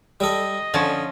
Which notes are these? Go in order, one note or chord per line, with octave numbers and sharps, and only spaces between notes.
G3 A4 D#5
D3 F3 C#4